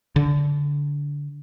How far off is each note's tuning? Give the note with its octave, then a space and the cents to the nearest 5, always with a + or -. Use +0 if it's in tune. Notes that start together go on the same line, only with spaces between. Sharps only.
D3 -20